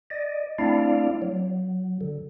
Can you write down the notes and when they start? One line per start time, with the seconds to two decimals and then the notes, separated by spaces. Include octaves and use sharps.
0.10 D5 D#5
0.59 A3 C4 D4 E4 D5 F5
1.22 F#3
2.01 D3